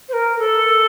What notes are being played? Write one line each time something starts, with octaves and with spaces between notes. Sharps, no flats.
C5
A#4
A4